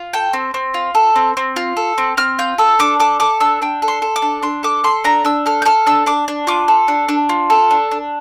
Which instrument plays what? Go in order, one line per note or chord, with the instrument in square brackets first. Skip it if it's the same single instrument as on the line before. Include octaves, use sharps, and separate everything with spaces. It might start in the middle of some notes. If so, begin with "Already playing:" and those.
Already playing: [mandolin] F4
A4 G5
C4
C4
F4
A4
C4
C4
F4
A4
C4
C4 F6
F4 G6
A4 E6
D4 D6
A4 D6
A4 D6
D4 E6
D4 G5
A4
C6
A4
D6
D4
D4 C6
A4 D6
A4 C6
D4 A#5
D4 E6
A4 F6
G6
A4 F6
D4 E6
D4 D6
D4
F4 D6
A4
D4
D4
F4
A4
D4
D4